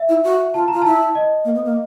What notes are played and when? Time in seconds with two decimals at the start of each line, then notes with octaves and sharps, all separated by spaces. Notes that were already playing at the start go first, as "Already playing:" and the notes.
Already playing: E5
0.09 E4
0.24 F#4
0.54 F4 A5
0.68 F4 A#5
0.82 E4 A5
1.15 D#5
1.45 A#3
1.55 B3
1.65 A#3